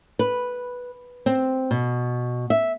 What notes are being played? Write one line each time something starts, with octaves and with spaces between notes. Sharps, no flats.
B4
C4
B2
E5